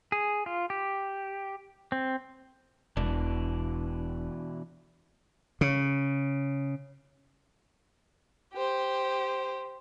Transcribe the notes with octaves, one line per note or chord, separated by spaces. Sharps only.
G#4
F4
G4
C4
E1 B2 E3 D4
C#3
G4 C5